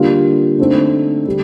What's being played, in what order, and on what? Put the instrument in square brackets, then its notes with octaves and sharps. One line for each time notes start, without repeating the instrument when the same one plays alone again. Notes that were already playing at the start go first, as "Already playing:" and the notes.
Already playing: [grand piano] D3 G3 A#3 F4
D3 A3 C4 D#4 A4
D3 G3